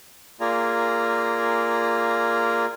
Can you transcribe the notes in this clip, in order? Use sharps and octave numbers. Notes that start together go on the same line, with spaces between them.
A#3 F4 G#4 D5 G#5 A#5